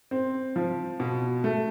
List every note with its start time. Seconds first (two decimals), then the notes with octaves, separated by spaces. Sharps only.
0.11 C4
0.56 F3
1.00 B2
1.44 A3